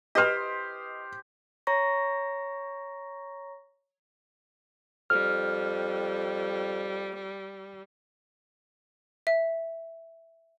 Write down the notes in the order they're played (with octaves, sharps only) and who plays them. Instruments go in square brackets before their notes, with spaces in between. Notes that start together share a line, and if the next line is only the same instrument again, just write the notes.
[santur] G4 C5 [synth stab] B4 D#5 [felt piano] D#6 F6
[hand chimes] C#5 A#5 C#6 A#6
[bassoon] F2 [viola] G3 [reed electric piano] F6
[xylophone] E5